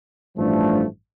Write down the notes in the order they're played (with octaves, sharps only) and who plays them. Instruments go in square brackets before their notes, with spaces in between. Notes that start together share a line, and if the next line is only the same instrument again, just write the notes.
[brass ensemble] A1 G2 F3 A3 D4